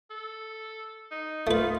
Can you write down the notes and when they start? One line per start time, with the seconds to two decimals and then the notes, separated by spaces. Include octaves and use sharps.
0.10 A4
1.11 D#4
1.47 A3 F4 B4